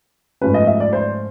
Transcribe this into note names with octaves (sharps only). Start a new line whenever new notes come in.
G#2 F3 A3 C#4 B4
D#5
E5
D5
C5